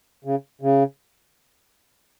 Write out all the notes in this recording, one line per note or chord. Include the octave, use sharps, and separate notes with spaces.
C#3
C#3